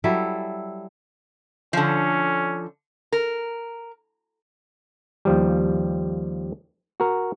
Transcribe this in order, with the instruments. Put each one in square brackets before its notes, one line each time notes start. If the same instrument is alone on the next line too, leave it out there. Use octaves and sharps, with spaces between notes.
[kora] F#3 G3 E4 A4
[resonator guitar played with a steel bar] D3 F3 [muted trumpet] C#4
[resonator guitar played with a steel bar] A#4
[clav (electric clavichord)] D#2 F3 G3
F#4 A#4